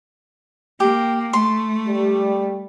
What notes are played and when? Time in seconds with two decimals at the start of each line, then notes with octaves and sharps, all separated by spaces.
0.80 A#3 G4
1.33 A3 C6
1.87 G3